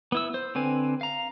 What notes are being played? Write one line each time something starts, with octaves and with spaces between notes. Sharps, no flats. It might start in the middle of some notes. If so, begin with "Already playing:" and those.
B3 E4 E6
C5
D3 C4 B4 G#5
F5 A#5